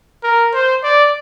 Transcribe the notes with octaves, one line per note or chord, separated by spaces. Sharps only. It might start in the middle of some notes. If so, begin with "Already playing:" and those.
A#4
C5
D5